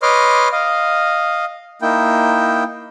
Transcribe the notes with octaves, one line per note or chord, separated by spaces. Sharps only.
B4 C#5 D#5 C6 D6 F6
D#5 F5
A#3 D#4 E4 G5